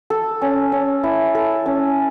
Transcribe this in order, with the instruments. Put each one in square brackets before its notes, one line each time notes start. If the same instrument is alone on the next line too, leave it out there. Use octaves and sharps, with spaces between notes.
[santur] A4
C#4
C#4
E4
A4
C#4